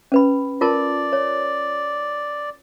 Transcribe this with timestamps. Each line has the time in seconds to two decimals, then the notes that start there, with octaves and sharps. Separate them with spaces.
0.12 C#4 B4 B5
0.61 F4 A#4 D5 A5
1.13 C#5